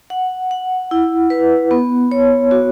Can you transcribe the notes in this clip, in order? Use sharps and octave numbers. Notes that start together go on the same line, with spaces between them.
F#5
F#5
E4
B4
B3
C#5
F#4